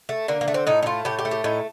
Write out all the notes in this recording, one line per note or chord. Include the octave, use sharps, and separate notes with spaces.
A3
D3 A#3
A#3
A3
C4
A2 D#4
D#4
A3 F4
A2 G4
G4
A3
G4
A2 D#4